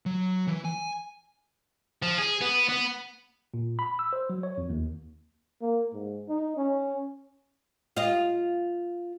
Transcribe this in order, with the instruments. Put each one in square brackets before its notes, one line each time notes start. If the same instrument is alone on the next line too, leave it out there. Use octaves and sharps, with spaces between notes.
[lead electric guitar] F#3
E3
G#5
[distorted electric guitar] F3
G#4
B3
B3
[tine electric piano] A#2
B5
E6
C5
F#3
C#5
F2
D#2
[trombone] A#3
G#2
D#4
C#4
[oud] F4 D#5